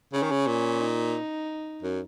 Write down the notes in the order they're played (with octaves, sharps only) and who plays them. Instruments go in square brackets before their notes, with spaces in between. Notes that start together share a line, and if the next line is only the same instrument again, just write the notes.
[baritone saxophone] C#3 [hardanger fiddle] C#4
[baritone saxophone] D#3
C#3
A#2
[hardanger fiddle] D#4
[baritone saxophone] F#2